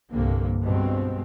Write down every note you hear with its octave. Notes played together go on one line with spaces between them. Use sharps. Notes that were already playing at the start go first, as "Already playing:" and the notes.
C2 G2 D3 A#3
G2 B2 G#3 C4